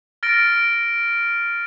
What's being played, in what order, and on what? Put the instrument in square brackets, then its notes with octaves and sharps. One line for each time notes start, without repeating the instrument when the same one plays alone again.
[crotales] F6 A6 A#6 D7